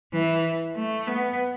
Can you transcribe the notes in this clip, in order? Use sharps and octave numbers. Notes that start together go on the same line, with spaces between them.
E3
A3
B3